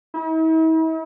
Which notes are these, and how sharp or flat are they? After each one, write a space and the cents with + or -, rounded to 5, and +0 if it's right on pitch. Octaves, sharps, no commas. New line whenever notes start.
E4 -45